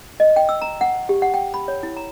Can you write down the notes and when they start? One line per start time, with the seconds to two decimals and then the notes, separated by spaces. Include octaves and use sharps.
0.20 D#5
0.36 G5
0.49 E6
0.62 A#5
0.81 F#5
1.09 G4
1.22 F#5
1.34 G5
1.54 B5
1.68 C#5
1.83 E4
1.97 A#5